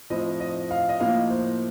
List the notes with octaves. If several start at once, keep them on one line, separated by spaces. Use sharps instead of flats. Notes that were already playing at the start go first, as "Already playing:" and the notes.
A2 F3 C4 D#5
D#5
F5
D#5
A2 F3 A#3 F5
C5